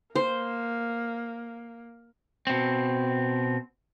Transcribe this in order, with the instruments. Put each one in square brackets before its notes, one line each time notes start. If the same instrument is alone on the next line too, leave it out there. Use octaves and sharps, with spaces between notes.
[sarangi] A#3 [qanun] C5
[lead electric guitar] B2 C4